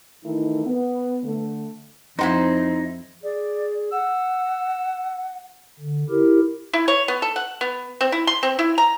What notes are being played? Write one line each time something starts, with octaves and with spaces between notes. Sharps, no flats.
D#3 E3 A3 D#4 E4
B3
D3 A3
F2 C4 D#4 E4 F#4 C5
G#4 D5
F#5 E6
D3
E4 G4 A#4
E4
C#5
B3
A4
F#5
B3
C4
E4
C6
C4
E4
A#5